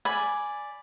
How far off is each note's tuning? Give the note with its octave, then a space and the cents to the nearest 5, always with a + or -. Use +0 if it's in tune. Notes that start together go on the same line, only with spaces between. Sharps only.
D5 +0 G#5 +0 B5 +0